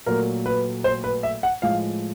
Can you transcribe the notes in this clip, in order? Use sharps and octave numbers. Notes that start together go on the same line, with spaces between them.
A#2 F#3 A3 A#4
B4
C5
B4
E5
F#5
A2 F3 G#3 F5